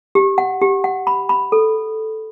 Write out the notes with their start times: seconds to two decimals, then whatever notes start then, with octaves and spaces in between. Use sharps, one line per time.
0.15 G4
0.38 F#5
0.61 G4
0.84 F#5
1.07 B5
1.29 B5
1.52 A4